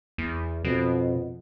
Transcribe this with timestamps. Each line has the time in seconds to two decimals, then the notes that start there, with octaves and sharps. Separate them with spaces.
0.18 E2
0.65 F2 B2